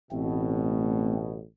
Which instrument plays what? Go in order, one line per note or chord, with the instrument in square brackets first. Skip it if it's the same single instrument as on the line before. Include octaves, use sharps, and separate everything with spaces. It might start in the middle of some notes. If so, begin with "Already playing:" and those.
[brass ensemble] A1 B2 [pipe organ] A3 C4